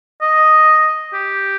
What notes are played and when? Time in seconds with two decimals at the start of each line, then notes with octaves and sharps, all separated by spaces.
0.22 D#5
1.14 G4